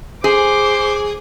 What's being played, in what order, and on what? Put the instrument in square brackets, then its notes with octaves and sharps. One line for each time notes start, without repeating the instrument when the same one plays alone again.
[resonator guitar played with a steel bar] G#4 [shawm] C5 [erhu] D6